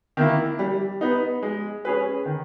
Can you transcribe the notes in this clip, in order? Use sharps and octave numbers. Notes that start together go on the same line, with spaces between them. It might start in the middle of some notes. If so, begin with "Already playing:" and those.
D#3 A#3 E4
G3
B3 D#4
G#3
C#4 G#4 B4
D#3